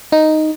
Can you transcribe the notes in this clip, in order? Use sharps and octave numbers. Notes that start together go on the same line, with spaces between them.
D#4